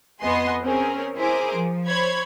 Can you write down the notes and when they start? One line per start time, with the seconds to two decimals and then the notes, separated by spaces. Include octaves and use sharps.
0.21 F2 B3 D#5 G#5 C6
0.63 C4 C#4 G#4 A#4
1.17 E4 G#4 A#4 C5 D6
1.54 F3
1.88 C5 C#5 B5 G#6